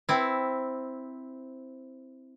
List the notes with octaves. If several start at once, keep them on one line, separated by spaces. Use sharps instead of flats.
C4 E4